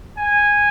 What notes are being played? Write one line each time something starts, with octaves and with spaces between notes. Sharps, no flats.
G#5